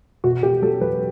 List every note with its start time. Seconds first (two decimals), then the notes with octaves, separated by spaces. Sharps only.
0.24 B2 F#4
0.43 B2 G4
0.62 F#3 A4
0.81 F#3 B4